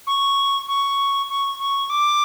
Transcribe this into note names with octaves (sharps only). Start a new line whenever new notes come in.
C#6
C#6
C#6
C#6
D6